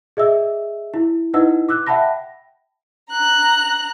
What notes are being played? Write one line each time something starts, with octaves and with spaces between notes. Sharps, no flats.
G#4 D#5 E5 E6
E4
D#4 E4 B4 D#5 F#5 E6
D6 E6 F#6
E5 F#5 G5 A5 B5 A#6
A#5 F#6